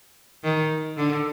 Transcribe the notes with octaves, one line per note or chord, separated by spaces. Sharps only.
D#3
D3